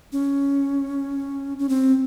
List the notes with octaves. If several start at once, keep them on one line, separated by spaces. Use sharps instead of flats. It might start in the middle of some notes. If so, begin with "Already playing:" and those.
C#4
C#4
C4